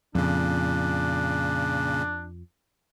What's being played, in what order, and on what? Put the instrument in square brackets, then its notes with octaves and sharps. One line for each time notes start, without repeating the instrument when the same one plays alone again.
[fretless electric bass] F2 [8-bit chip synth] A#2 C#3 [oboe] D4